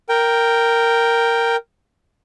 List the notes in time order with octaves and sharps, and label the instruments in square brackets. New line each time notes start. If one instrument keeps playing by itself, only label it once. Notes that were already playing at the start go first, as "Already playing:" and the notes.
[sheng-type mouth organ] A#4 G5